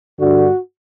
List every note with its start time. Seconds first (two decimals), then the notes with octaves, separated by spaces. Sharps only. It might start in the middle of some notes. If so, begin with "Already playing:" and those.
0.20 G2 D3 F#4